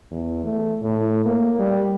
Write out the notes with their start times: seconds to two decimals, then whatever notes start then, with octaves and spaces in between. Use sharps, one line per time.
0.11 E2
0.44 A3
0.82 A2
1.25 A#3
1.59 G3